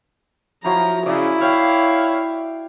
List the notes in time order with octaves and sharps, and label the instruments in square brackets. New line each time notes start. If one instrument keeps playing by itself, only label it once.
[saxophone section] F3 [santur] F#3 E4 [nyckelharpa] A#5
[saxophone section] C#3 [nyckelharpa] E4 [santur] D5
[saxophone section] C#5 F5 [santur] G5